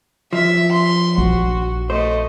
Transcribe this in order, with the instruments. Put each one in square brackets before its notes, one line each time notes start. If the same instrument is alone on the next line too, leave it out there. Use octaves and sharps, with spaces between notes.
[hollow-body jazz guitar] F3 [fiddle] E5
[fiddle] C6
[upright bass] A#1 [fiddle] F#4
[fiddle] A3 D#5 [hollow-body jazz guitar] C5